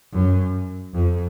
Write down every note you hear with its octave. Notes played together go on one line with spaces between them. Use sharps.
F#2
F2